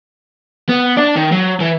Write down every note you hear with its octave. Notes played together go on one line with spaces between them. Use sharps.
B3
D4 D5
D#3
F#3
E3